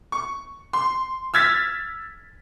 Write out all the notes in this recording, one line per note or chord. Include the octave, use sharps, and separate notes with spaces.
C#6
C6
E6 F6 G#6 A6 B6